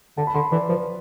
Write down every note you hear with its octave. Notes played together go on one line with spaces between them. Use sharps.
D3 A5
B5
D3 C6
E3 D5
F3 B4